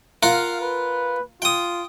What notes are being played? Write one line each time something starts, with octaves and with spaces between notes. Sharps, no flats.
F4 A#4 F5 F#5
B4
F4 G5 D#6